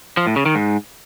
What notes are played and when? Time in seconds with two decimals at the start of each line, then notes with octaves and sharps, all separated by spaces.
0.17 F3
0.27 A2
0.36 C#3
0.46 D#3
0.55 G#2